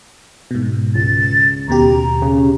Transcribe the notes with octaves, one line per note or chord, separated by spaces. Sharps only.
G#2 B2
C#2 A6
D#2 B2 G4 A#5
C#3